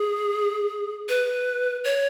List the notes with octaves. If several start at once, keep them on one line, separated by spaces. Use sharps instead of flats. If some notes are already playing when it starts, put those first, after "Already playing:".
Already playing: G#4
B4
C#5